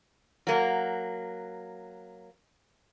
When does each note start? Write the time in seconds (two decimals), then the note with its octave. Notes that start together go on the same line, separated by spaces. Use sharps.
0.47 F#3 A#3